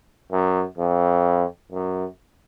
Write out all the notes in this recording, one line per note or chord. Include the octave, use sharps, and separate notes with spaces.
F#2
F2
F#2